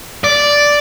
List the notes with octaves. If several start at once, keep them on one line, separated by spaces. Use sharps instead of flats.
D5